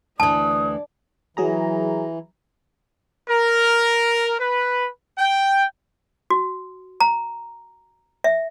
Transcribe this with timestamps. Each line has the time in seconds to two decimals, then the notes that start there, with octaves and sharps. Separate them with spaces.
0.20 D2 E3 D5 A5 D#6
1.37 E3 F#3 G#4 A#5
3.29 A#4
4.39 B4
5.18 G5
6.30 F#4
7.00 A#5
8.24 E5